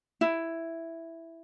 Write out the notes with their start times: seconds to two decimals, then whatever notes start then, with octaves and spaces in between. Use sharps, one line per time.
0.21 E4